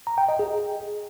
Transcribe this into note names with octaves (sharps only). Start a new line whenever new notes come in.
A#5
G5
D#5
G#4